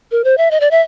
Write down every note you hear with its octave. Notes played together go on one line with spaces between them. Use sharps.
A#4
C5
E5
D#5
D5
E5